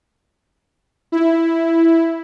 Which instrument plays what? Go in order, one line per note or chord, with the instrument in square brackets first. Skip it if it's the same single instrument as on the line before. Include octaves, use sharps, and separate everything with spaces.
[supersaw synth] E4